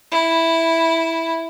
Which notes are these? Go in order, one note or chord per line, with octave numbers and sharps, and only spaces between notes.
E4